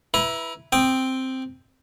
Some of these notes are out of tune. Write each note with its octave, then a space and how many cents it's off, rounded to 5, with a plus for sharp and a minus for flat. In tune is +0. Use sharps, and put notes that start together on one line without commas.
E4 +0 B4 +0 A#5 +30
C4 +0 G5 +5 D#6 -20